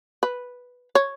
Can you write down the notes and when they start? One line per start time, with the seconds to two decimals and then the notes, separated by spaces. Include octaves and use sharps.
0.23 B4
0.95 C#5